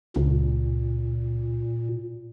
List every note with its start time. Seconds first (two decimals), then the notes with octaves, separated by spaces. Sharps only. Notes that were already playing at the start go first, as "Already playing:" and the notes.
0.16 C#2 A#2